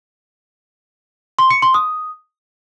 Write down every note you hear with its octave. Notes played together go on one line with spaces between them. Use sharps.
C6
C#7
C6
D#6